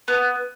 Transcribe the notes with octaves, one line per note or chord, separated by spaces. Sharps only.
B3